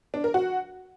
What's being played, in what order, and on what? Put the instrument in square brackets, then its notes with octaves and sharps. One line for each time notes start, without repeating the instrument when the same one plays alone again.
[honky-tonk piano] D4
A#4
F#4